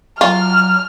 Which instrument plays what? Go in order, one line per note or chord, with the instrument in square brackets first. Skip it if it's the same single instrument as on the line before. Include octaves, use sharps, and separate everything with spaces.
[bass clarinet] F#3 [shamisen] F4 [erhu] F6